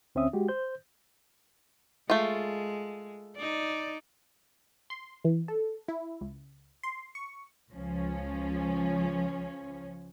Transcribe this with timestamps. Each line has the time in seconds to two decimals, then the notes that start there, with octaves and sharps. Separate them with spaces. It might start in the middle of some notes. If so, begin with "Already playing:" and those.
0.15 D2 C4 C#4 E5 D#6
0.33 G#3 F#4 G4
0.48 C5 G6
2.10 G#3 A3 F4
3.37 D#4 D5
4.90 C6
5.24 E3
5.48 A4
5.88 E4
6.21 C#2
6.83 C6
7.15 C#6
7.74 C#2 F3 C#4